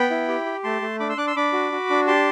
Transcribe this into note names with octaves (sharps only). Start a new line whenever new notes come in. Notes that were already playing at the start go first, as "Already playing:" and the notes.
Already playing: B3 G5 B5
E4
G4
G4
A3 A5 C6
A3
D4 B5 D6
C6 E6
D4 D6 F#6
C6 E6
D4 B5 D6
F#4
F#4
D4
G4 A5 C6